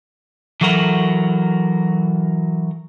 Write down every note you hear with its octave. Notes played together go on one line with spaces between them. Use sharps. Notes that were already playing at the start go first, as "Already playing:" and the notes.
E3 F#3 F#4 A4 A#4